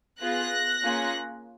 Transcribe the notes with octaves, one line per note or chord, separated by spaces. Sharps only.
B3 F4 G#4 F#6 A#6
A#3 C#4 F4 G#4